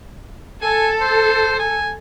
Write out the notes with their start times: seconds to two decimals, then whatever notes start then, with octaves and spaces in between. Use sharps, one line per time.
0.62 A4 G#5
1.01 C5
1.59 G#5